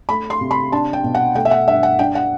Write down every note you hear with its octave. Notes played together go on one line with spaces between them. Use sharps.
A3 B5
C6
C3
B5
D4 A5
G5
B2
F#5
A3 G5
E5
F#5
G2 E5
F#5
D4 G5
F#5